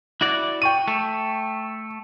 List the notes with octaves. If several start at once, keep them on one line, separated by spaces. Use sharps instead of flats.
E4 F#4 D5
G5 C#6 D#7
A3